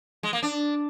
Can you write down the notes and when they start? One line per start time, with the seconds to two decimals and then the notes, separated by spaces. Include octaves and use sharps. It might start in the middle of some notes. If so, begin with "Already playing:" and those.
0.23 G#3
0.33 A#3
0.43 D4